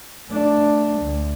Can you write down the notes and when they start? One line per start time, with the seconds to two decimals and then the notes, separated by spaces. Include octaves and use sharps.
0.30 A3 D4
1.02 D2